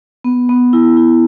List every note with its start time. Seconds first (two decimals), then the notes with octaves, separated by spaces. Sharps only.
0.24 B3
0.49 B3
0.73 E4
0.97 E4